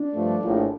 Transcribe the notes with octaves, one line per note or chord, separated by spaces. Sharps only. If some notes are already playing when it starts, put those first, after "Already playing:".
Already playing: D4
G2 F3 A3
A#1 A2 F3